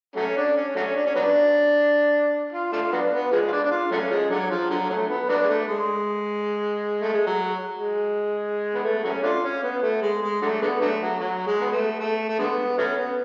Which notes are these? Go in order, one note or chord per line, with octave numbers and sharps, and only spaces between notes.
F#3 A3 C#4
D4
C#4
F#3 A3 C#4
D4
C#4
F#3 B3 D4
F4
A3 D4 F4
F#3 B3 D4
B3
F3 G#3
F4
D4
D4
F4
F#3 A3 C#4
F3 G#3
D3 F#3
F3
D3 F#3
D3 F#3 A3
B3
F#3 B3 D4
G#3
A3
G#3
A3
G#3
F#3
G#3
B3
A3
F#3 A3 C#4
A3 D4 F4
C#4
B3
A3
G#3
G#3
D3 F#3 A3
D3 G#3 B3
D3 F#3 A3
F#3
F#3
G#3
B3
A3
A3
A3
D3 G#3 B3
F#3 A3 C#4
B3